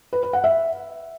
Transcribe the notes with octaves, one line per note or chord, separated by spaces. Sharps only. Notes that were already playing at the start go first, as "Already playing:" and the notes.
B4
B4
F#5
E5